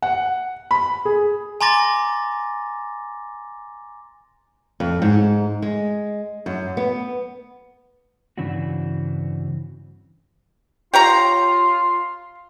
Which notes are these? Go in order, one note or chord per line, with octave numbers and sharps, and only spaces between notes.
F#5
B5
G#4
G#5 A#5 C6 D6 A6 A#6
F2
G#2
G#3
F#2
B3
G2 C#3 E3 C4 D4 F#4
F4 G4 C#5 A#5 C6